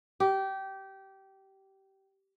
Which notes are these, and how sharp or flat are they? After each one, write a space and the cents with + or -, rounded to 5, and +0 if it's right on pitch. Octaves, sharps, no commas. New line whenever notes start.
G4 -20